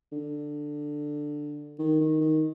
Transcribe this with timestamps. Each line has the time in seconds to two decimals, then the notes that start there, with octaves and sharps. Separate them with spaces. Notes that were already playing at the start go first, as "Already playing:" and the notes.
0.12 D3
1.79 D#3
2.01 D#3
2.20 D#3